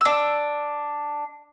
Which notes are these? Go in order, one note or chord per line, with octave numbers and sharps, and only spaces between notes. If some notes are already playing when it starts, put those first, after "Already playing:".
D4 E6